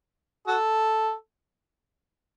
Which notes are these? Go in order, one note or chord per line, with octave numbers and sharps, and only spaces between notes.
F#4 A4